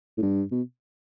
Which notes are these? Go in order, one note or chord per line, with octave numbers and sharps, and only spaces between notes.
A2
G2
B2